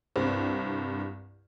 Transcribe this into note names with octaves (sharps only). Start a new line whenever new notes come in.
C2 G2 C4